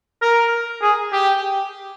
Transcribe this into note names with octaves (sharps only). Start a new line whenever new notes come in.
A#4
G#4
G4